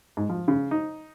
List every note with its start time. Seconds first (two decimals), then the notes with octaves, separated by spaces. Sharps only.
0.17 G#2
0.30 F3
0.48 C#3
0.71 D#4